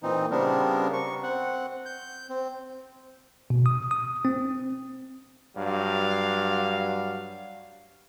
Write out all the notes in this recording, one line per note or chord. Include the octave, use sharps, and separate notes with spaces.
A#2 E3 C4 D#4
C#3 G3 B3 C4 D4 A#4
C#6
C4 F#5
G6
C4
B2
D#6
D#6
C4
G2 F#3 F5